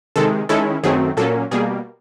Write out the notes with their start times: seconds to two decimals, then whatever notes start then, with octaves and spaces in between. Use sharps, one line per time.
0.16 C3 D#3 G#3 A4
0.49 D#3 G#3 C#4 E4 A4
0.83 F#2 D#3 F#3 A3 C4 G#4
1.17 A#2 F#3 A#3 C#4 A4
1.51 B2 G3 A#3 G#4